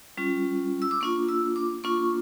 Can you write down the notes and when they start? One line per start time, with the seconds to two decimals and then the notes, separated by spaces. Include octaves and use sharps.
0.17 G3 C#4 F4
0.82 E6
0.91 D6
1.01 A#3 D4 F4 C#6
1.29 E6
1.56 D6
1.84 A#3 D4 F4 C#6